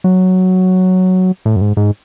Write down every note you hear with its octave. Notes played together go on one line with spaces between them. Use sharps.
F#3
A2
F#2
G#2
G#2